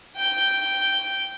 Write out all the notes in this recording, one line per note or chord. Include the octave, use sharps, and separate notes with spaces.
G5 G6